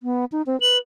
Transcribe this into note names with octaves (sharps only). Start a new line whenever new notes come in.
B3
D#4
C4
B4 F#7